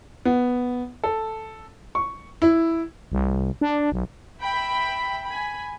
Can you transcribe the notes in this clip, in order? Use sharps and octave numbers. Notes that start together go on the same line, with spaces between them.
B3
A4
C#6
E4
C2
D4
B1
E5 G5 B5
G#5 B5